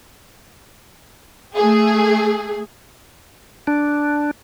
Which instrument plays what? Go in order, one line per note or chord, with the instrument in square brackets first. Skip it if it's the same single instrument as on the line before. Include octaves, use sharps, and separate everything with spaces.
[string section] A3 G#4
[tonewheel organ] D4